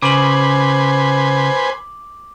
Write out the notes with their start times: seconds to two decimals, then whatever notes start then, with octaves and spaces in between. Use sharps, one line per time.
0.02 C#3 B4 C5 G#5 D6 F#7